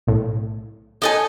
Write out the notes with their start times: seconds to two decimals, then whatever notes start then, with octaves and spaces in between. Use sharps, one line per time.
0.07 B1 A2
1.02 D#4 A4 G#5